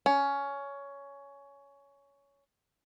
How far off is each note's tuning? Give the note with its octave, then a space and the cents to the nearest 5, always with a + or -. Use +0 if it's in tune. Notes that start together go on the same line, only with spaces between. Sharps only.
C#4 +15